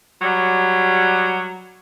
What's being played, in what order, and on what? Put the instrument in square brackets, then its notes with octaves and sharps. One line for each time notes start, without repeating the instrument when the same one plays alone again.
[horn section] F#3 G3